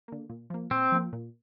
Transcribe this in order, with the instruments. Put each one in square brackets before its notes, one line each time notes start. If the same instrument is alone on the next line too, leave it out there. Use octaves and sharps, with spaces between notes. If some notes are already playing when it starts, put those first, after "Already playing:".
[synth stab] D3 A#3
A#2
F3 A#3
[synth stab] A#2 [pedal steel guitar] C4
[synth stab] F3 A#3
A#2